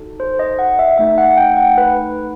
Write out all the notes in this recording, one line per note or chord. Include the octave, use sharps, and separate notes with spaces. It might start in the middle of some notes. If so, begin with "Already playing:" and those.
Already playing: D#4 F#4 A4
C5
D#5
F#5
E5
A3 D#4 A4 E5
F#5
G5
F#5
B4